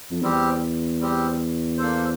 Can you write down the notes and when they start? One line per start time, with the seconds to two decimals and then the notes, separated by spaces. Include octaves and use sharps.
0.11 F2
0.22 E2 G3 C4 G4
1.01 G3 C4 G4
1.78 A#3 D4 A4 C5